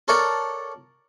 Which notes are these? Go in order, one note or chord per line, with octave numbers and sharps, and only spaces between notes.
A4 A#4 C#5 D5 F#5